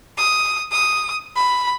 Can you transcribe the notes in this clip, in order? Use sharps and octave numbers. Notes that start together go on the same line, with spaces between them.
D#6
D#6
B5